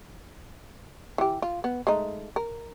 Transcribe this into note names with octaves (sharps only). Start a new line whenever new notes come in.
E3 G4
F4
B3
G#3 A3 D#4
A#4